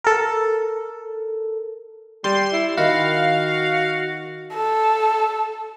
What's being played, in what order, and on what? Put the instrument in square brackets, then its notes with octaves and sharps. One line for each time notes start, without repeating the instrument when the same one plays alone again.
[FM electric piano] A4 A#4
[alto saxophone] G3 [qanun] D5 A5 [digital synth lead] C6
[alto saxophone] E4
[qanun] D#3 B5 [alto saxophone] F#4 [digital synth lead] F5
[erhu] A4